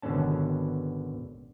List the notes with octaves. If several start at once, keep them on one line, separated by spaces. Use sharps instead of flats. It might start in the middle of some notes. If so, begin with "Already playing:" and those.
G#1 B2 D3 B3 C#4 A5